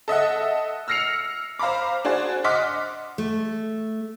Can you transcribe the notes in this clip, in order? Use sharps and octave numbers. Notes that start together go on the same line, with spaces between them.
A4 D#5 E5 F#5
E6 F6 A#6 C7 C#7 F7
C5 F5 A#5 B5 D6
D4 F#4 G#4 C5
D#5 F#5 C6 D6 F6 B6
A3